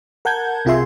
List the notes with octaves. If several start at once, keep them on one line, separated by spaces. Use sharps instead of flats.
A#4 F#5 A5 G6 G#6
C2 C3 F4 G#4 E5 C6